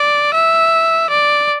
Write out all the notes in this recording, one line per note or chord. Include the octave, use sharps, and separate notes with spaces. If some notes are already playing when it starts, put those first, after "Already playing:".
Already playing: D5
E5
D5